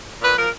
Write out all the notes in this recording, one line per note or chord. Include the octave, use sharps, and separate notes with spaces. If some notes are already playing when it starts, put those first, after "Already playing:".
A#2 B4
F3 A#4